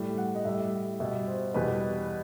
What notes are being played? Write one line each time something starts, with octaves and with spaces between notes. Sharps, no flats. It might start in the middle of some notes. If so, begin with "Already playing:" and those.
Already playing: A2 G3
F#5
D#5
A2 G3 E5
B2 G3 E5
C5
E2 B2 G3 B4